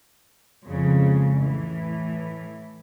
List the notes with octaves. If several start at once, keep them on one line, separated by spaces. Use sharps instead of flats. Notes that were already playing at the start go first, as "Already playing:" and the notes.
F2 G#2 C#3
A2 E3